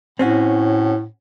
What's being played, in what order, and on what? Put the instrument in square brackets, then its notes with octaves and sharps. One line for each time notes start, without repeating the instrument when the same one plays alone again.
[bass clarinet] A2 [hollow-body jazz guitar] C4 C#4 F#4